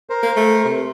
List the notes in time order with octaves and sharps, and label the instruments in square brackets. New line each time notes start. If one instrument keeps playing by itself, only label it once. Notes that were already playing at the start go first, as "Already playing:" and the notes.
[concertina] A#4 C5
[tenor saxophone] A#3
A3
C3